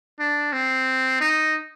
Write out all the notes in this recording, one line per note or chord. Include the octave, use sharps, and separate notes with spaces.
D4
C4
D#4